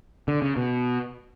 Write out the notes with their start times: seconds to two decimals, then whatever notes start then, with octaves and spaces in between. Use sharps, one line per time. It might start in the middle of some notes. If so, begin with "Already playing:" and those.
0.28 D3
0.42 C#3
0.57 B2